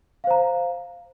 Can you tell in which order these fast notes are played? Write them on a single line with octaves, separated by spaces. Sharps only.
F5 C5 A#5